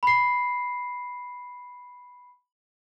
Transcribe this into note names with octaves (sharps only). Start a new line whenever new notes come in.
B5 C7